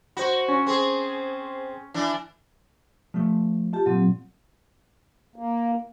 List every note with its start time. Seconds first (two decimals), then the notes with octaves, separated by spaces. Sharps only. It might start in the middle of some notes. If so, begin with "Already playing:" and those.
0.17 F#4 C5 B5
0.48 C#4
0.66 C4 G#4 C5 C6
1.94 E3 D4
3.14 F3 A3
3.73 F4 G4 A5
3.86 A#2 F#3 C4
5.36 A#3